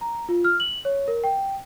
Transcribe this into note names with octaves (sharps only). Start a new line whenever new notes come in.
A#5
F4
F6
F#7
C#5
A#4
G5